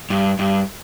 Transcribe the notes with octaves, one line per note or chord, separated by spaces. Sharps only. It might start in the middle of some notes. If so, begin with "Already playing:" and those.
G2
G2